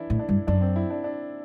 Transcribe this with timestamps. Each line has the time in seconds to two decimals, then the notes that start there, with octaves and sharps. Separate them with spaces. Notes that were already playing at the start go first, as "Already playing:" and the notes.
Already playing: E3 D4 E4
0.10 A2
0.19 D4
0.29 G2
0.47 F#2 D4
0.61 C4
0.76 E4
0.90 D4
1.04 D4